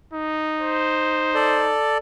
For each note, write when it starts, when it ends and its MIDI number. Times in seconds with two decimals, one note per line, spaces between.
0.13 1.78 63
0.60 1.69 72
1.35 1.98 69
1.35 1.98 74